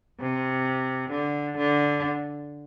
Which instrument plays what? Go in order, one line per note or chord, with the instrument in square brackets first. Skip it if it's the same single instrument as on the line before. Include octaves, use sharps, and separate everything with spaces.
[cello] C3
D3
D3